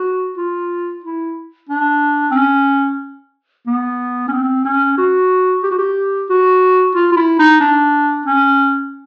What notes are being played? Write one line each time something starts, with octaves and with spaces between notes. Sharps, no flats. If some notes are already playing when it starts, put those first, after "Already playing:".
Already playing: F#4
F4
E4
D4
C4
C#4
B3
C#4
C4
C#4
F#4
G4
F#4
G4
F#4
F4
F4
E4
D#4
D4
C#4